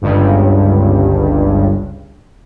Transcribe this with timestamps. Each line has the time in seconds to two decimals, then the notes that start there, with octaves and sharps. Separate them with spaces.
0.02 G1 C#2 G2